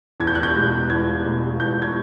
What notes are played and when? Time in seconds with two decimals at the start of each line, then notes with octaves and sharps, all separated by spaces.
0.20 E2 G#6
0.27 G6
0.35 F#6
0.43 G6
0.55 B2 G#3
0.90 E2 G#6
1.25 B2 G#3
1.60 E2 G6
1.82 G#6